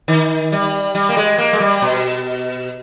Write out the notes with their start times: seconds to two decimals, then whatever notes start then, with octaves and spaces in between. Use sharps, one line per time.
0.08 D#3
0.52 G3
0.95 G3
1.09 A#3
1.17 G#3
1.38 A#3
1.53 G#3
1.60 G3
1.82 B2